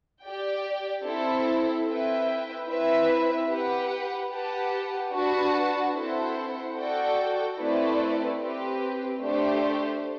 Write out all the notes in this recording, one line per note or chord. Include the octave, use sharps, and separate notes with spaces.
G4 D5 G5
C4 E4 A4
C4 E4 B4 E5 G5
C4 E4 B4 E5
G4 B4 F#5
G4 B4 F#5 A5
D4 F#4 B4 F#5 A5
C4 E4 A4 C5 F#5
F#4 A4 D5 G5
A3 C4 E4 B4 D5
C4 G4 B4
A3 D4 G4 C5